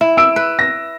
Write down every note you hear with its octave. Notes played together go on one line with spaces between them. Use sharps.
E4
E6 D7
B4
A#6